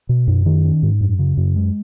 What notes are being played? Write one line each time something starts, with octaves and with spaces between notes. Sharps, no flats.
B2
F#2
D#3
C#4
G#2
F#2
C#3
F#2
G#3